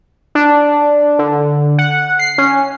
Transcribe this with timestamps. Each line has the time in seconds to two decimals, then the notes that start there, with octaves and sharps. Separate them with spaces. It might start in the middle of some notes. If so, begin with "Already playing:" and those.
0.35 D4
1.19 D3
1.78 F#5
2.19 C7
2.38 C#4